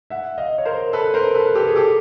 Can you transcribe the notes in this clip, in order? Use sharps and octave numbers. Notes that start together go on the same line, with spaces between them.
E5 F#5
D#5 F5
C#5
A#4 C5
A4 B4
A#4 C5
A4 B4
G4 A4
G#4
G4 A4